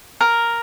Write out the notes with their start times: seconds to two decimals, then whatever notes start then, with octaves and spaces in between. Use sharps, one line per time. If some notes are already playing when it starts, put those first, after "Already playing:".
0.21 A#4